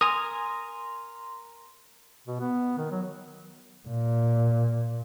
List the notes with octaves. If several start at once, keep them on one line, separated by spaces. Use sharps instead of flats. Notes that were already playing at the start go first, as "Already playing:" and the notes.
A#4 G#5 A#5 C6 D#6
B2
B3
D#3
F#3
A#2